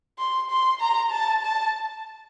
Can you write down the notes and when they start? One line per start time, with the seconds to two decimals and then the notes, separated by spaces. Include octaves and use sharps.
0.19 C6
0.50 C6
0.81 A#5
1.11 A5
1.42 A5